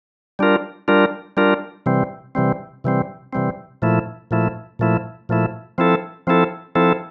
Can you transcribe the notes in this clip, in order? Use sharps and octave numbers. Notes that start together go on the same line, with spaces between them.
G3 D4 F4 A#4
G3 D4 F4 A#4
G3 D4 F4 A#4
C3 E3 G3 C4
C3 E3 G3 C4
C3 E3 G3 C4
C3 E3 G3 C4
A#2 F3 A3 E4
A#2 F3 A3 E4
A#2 F3 A3 E4
A#2 F3 A3 E4
F3 C4 E4 A4
F3 C4 E4 A4
F3 C4 E4 A4